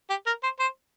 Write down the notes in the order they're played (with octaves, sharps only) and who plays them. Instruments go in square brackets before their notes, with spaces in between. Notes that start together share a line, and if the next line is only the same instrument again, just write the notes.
[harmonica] G4
A#4
C5
C5